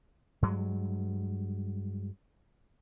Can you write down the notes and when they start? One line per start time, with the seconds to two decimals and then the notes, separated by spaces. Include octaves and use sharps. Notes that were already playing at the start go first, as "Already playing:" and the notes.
0.42 G2 F#3 G#3